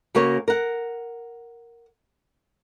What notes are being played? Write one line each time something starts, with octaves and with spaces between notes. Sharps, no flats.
C#3 A#3 F#4 A#4 C#5
A#4 F#5